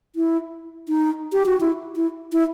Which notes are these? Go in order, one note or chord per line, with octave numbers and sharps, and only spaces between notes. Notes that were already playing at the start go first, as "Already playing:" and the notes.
E4
D#4
G4
F#4
E4
E4
E4